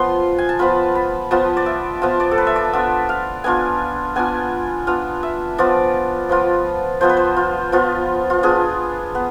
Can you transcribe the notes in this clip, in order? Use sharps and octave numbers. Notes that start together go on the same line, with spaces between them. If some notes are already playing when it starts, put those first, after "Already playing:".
Already playing: F3 B3 F4 C6
G#5
A5
F3 B3 F4 B5
B5
F3 B3 F4 A5
D5
E5
F3 B3 F4 A5
D5
A4
B4
E5
D5
B3 D4 F4 E5
F5
B3 D4 F4 G#5
B3 D4 F4 G#5
B3 D4 F4 F5
E5
F3 B3 F4 D5
F3 B3 F4
F3 B3 F4 C5
B4
C5
F4
F3 B3 F4
F4
B3 D4 F4 G#4
B3